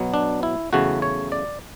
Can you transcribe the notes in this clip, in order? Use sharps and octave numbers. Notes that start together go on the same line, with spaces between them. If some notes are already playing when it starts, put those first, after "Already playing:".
Already playing: B2 F#3 B3
D4
E4
E2 C#3 F#3 A3 F#4
C#5
D5